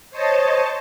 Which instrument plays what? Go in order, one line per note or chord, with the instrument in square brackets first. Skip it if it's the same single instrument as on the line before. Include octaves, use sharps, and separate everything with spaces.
[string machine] C5 C#5 D#5 A5